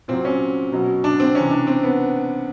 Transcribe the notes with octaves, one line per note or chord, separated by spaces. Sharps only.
A#2 F#3 C4
C#4
B2 F#3
D4
C4
C3 E3 C#4
D4
C4
B3